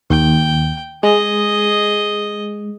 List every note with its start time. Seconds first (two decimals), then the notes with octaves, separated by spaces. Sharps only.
0.10 D#2 G5
1.03 G#3 G#4 D#5